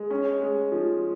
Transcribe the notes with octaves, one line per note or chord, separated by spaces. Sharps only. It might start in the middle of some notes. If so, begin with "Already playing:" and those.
Already playing: G#3
C#4
G#3
F3